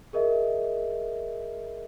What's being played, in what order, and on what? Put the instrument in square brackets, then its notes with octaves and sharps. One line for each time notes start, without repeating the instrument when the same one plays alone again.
[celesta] G#4 A#4 D#5 E5